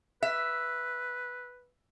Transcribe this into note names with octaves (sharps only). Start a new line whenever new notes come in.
B4 E5